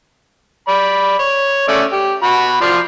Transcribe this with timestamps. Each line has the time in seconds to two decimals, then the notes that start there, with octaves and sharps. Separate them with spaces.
0.68 D5 B5
1.19 C#5
1.68 A3 C#4 D5
1.92 G4
2.23 F#4 B5
2.61 F3 D5 C6